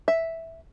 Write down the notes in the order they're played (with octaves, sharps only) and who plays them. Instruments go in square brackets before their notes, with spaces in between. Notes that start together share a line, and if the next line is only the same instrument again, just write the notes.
[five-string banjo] E5